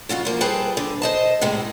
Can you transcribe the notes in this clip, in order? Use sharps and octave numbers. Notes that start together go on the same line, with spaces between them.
F2 C#3 F4 F#4
F3 A#3
G3 G#4 A4 B4 C5 G5
D3
C5 D#5 A5
A2 C3 G3 G#3